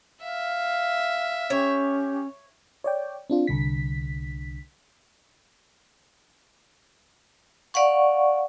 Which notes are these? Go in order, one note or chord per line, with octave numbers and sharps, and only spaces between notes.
E5 F5
C#4 G4 C#5
C#5 D5 G5
C4 D4 F4
C2 D3 B6
D5 F5 F#5 C#6